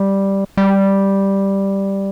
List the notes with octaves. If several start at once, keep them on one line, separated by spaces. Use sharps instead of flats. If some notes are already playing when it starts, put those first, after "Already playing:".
Already playing: G3
G3